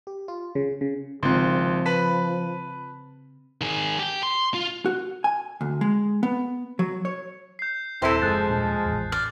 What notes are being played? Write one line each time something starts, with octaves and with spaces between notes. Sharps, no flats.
G4
F4
C#3
C#3
G#1 C#3 F3 C4 F4 C6 F#6
B4 A5 B5 B6
D#3 G#4
G4 G5
C6
F4
F#4
G#5
D2
G#3
B3
F#3
C#5
G6 C7
D#1 C3 C4 E4 A4 C5
F#1 F3 G#3 F#6 A6
D#1 A#2 D4
A1 E2
D5 F6